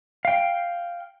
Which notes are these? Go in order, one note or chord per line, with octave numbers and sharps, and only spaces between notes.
F5 G5